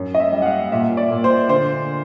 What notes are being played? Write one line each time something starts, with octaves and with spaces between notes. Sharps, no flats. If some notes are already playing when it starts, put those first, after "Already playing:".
Already playing: F#2
D#5
E5
G3
F#5
F5
A#2 E5
D5
A#2
C5
D3 C5